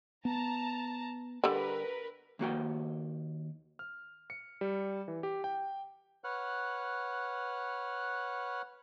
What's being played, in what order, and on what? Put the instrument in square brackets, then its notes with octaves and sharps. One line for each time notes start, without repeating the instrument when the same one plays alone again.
[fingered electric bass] B3 [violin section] A5 A#5
[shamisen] D3 G3 [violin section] A#4 B4
[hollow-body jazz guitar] D#2 A#3 F#4 G5
[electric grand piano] F6
C#7
G3
E3
G4
G5
[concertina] B4 C#5 F#5 F6 F#6